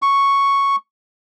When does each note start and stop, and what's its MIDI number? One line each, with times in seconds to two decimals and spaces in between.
0.02 0.76 85